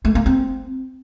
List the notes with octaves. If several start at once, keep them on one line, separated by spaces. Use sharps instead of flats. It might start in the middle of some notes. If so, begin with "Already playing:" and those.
A3
A#3
C4